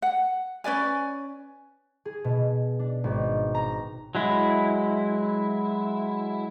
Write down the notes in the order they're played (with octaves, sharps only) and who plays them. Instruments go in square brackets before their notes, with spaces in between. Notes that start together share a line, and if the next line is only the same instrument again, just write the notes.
[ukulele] F#5
C#4 B4 D5 G#5
[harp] G#4
B2
D4
G#1
A#5
[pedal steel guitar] F#3 G#3 E4